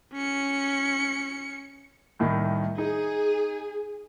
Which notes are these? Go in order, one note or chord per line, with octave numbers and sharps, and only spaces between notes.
C#4 C#7
C2 A2 D#3
D#4 G#4